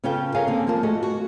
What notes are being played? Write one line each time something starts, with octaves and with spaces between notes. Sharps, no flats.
C#3 C#4 F4 A4 B4 G5
G#4 A#4 C#5 F5 F#5 G#5
D3 A#3 C4 D4
F3 A#3 A#4 A5
A3 F#4 G#4 D#5
F#4